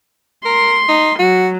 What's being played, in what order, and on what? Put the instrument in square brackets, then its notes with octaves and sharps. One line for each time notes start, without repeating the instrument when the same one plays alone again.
[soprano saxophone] A#4 [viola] C6
[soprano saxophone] D#4
[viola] F#3 [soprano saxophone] F#4